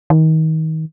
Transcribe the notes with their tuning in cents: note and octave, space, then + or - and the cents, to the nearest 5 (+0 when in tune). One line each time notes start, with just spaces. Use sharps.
D#3 +30